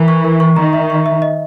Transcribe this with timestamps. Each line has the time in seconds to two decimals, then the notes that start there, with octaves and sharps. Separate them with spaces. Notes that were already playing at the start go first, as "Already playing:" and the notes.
Already playing: E3 A#4 E5 A#5
0.08 C#6
0.25 A#4
0.40 C#6
0.56 D#3 A#5
0.73 E5
0.90 C#6
1.06 E5
1.22 D#5